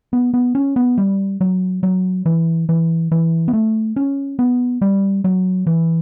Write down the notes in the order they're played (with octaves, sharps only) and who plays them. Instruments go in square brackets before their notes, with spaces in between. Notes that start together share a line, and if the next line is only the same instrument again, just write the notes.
[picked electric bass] B3
B3
C#4
B3
G3
F#3
F#3
E3
E3
E3
B3
A3
C#4
B3
G3
F#3
E3